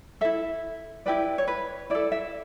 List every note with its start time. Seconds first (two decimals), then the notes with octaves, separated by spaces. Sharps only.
0.21 E4 A4 E5
1.06 E4 G4 B4 D5
1.38 C#5
1.48 B4
1.90 E4 A4 D5
2.12 E5